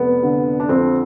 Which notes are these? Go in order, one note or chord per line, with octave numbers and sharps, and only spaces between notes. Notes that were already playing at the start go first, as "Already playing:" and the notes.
Already playing: F1 B3
D3
D4
F2 C4